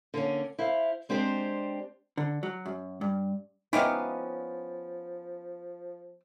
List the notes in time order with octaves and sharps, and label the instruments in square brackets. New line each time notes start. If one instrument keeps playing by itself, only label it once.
[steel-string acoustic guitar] D3 A#3 C4 C#4
E4 C5 F5
G#3 C4 D4 G4 C5
[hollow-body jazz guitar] D3
F#3
F#2
G2
[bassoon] F3 [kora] B3 C#4 [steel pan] D#4 [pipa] E4 G4 F5